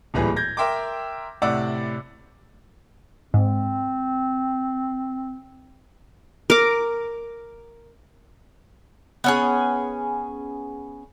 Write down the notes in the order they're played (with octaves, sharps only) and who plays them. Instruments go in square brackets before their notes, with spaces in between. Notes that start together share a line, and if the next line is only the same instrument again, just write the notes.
[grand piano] D1 A#2 E3 G3 G#4 B4
G6 G#6 A#6
A#4 E5 G5 C6 D6
A2 C3 D5 F#5 D6 E6
[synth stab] G#2 [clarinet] C4
[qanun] A#4 D6
[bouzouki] B3 C#4 G#4